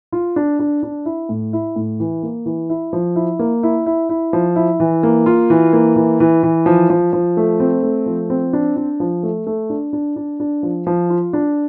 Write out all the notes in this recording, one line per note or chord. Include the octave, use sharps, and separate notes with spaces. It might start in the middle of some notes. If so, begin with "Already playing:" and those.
F4
D4
D4
D4
E4
A2
E4
A2
E3
A#3
E3
E4
F3
E4
A#3
E4
E4
E4
F3
E4
E3
A#3
F4
E3
A#3
E3
E3
E3
F3
F3
F3
A3
C4
A3
F3
C4
D4
D4
F3
A3
A3
D4
D4
D4
D4
F3
F3
F4
D4